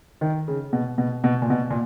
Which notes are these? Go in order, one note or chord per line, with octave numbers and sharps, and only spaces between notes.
D#3
C#3
B2
B2
B2
A#2
B2
A#2